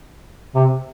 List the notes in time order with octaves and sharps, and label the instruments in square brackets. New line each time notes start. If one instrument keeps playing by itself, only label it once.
[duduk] C3